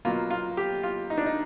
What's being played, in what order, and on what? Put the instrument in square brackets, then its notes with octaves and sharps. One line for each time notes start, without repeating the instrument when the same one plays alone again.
[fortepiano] B2 F#3 A#3 F4
F4
G4
F4
D#4
D4
D#4